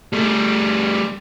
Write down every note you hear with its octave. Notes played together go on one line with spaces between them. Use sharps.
G3 A3